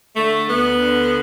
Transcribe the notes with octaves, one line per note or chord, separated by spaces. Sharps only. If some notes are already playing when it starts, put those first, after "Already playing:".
D3 A3
D2 B3
D3